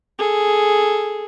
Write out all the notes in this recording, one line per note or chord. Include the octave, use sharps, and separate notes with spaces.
G#4 A4